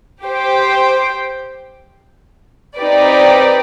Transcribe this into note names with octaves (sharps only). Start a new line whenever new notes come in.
G4 C5 G5
C4 D#4 G4 B4 D5